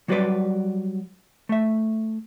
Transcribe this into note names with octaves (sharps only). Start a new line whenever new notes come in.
F#3 G3 F#4 G#4 B4 D5
A3 E5